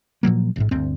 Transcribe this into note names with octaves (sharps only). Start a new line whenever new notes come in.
A#2 F3 F#3 A#3
A1 E2 G#2
G1 D2 C4